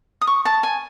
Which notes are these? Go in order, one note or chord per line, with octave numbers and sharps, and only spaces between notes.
D#6
C#6
A5
G#5